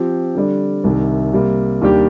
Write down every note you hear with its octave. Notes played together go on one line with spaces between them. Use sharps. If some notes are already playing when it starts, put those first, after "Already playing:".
Already playing: F3 C4 G4
D3 G3 D4
C2 C3 D#3
C3 G3 A#3
D#2 D#3 G3 D4 G4